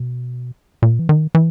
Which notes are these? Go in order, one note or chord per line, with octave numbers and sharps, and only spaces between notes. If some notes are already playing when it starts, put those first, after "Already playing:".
Already playing: B2
A#2
E3
D#3
E3